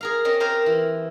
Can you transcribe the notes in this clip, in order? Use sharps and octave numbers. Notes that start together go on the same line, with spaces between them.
G#4 A#4 F5
C4 C#4 D#5
G4 A#4 C5 F5 G#5
E3